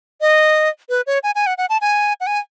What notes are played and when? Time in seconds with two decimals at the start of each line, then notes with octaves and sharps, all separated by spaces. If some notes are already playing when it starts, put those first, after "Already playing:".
0.21 D#5
0.89 B4
1.07 C#5
1.23 G#5
1.35 G#5
1.47 F#5
1.58 F#5
1.69 A5
1.81 G#5
2.21 F#5
2.27 G#5